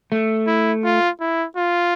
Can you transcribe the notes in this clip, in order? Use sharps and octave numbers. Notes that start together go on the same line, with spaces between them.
A3
E4
F4
E4
F4